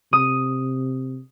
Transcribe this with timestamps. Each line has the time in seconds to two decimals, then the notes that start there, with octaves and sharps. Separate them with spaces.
0.13 C3 D#6